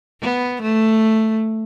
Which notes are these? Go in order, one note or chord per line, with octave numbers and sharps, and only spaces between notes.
B3
A3